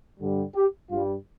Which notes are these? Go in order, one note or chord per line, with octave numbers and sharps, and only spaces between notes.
G2 D3 G3
G4
G2 G3 F4